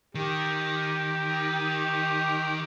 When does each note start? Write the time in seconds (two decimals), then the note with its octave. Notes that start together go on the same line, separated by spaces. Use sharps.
0.15 D#3 G4